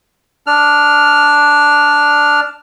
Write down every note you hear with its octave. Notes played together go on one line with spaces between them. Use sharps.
D4 F6